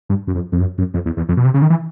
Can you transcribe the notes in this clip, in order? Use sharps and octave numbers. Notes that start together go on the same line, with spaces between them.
G2
F#2
F2
F2
F#2
F#2
F2
E2
E2
F2
B2
C3
C#3
D#3
E3